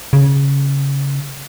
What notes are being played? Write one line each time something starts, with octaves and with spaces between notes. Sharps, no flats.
C#3